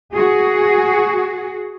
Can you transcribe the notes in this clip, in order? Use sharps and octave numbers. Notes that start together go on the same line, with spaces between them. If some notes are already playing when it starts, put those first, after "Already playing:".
F#4 G#4